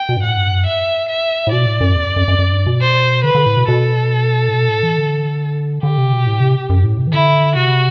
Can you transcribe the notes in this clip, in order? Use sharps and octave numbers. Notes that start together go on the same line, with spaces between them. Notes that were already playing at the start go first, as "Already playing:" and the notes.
Already playing: G5
B2
G2
A2 F#5
G2
F#2
E5
E5
A2
B2 D5
A2
F#2
E2
F#2
F#2
F#2
F#2
G2
B2
C5
D3 B4
D3
A2
B2
B2 A4
A2
B2
A2
E3
D3
D3 G4
C3
B2
A2
C3
F#2
A2
C3
E3
D3 E4
C3 F#4